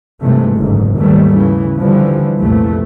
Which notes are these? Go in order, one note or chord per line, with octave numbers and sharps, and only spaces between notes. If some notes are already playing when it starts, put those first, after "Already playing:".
G2 C3 D#3 E3 G#3 A3
F#1 D2 G#2 B2
D#2 G#2 D#3 E3 G3 A3
C#3 E3
D3 E3 F3 G3
C2 F2 A#2 E3 A3